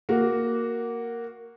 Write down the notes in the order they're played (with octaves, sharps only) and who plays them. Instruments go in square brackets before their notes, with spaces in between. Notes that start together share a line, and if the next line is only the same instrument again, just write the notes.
[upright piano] A#3 F#4